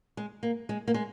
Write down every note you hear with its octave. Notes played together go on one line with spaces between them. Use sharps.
G#3
A#3
G#3
A#3
G#3